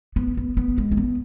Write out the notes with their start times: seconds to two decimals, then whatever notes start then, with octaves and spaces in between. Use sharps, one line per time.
0.16 B3
0.37 B3
0.57 B3
0.78 G#3
0.91 C#4
0.97 B3